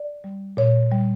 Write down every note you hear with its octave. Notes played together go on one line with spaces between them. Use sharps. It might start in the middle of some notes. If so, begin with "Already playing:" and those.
Already playing: D5
G3
A#2 C#5
G3